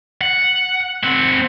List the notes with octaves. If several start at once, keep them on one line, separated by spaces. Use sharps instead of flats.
F#5
C4 F#5